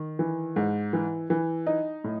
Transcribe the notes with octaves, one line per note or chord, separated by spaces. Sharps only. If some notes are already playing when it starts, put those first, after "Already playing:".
Already playing: D#3
E3
G#2
E3
E3
D#4
A2